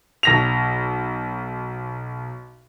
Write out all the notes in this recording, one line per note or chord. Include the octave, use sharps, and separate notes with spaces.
B1 A#6 F7